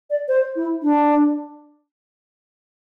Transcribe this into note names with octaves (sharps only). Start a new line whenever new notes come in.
D5
C5
E4
D4